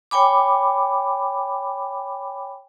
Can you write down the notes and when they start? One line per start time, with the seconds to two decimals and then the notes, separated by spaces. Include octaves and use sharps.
0.11 C#5 G5 G#5 B5 D6